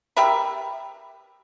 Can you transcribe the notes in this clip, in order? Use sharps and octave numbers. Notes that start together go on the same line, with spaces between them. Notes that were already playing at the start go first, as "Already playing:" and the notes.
G4 A#4 E5 B5